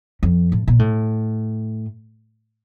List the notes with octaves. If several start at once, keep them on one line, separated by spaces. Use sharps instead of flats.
F2
A2
A#2
A2